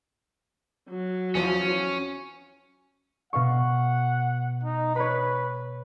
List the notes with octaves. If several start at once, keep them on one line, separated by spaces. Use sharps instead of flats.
F#3
E2 F3 C#4
B2 F5 F#5 C#6
D#4
B4 C#5 B5